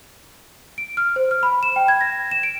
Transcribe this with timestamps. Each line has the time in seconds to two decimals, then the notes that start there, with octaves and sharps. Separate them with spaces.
0.78 D7
0.97 F6
1.16 C5
1.31 F6
1.43 B5
1.63 E7
1.76 G5
1.88 G#6
2.01 A#6
2.31 E7
2.43 D7